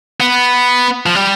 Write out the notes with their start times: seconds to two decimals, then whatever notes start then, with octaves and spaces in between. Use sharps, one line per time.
0.20 B3
1.06 F3
1.15 G3